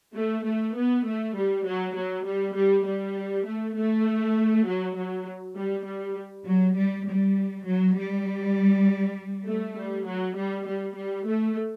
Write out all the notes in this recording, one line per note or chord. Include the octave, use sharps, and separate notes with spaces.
A3
A3
B3
A3
G3
F#3
F#3
G3
G3
G3
A3
A3
F#3
F#3
G3
G3
F#3
G3
G3
F#3
G3
A3
G3
F#3
G3
G3
G3
A3